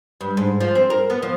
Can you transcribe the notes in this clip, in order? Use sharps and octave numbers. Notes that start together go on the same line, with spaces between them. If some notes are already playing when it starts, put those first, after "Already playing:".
G2
G#2
F3
C4
A#4
B3
F3